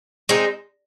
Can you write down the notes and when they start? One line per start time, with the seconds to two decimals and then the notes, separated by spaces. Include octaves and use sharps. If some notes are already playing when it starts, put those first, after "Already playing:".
0.29 G#3 C4 D#4